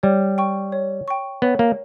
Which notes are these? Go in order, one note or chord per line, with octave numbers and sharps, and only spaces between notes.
G3 C#5
G5 C#6
C#5
G5 C#6
B3 C#5
A#3